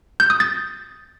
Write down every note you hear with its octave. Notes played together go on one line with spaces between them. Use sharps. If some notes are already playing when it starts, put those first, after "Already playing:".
G6
D#6
A6